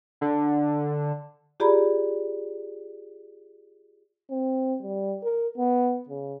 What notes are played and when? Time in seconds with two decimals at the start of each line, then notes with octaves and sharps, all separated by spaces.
0.21 D3
1.60 F4 G4 G#4 D5 A#5 B5
4.31 C4
4.83 G3
5.23 A#4
5.58 B3
6.09 C#3